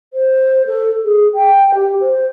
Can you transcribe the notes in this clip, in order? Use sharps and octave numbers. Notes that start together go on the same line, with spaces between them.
C5
A4
G#4
G5
G4
C5